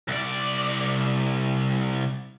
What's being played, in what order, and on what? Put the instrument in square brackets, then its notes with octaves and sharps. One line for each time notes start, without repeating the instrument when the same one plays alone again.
[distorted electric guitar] C2 D5